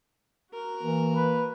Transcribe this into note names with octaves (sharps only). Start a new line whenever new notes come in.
F#4 A#4
E3 A#3
B4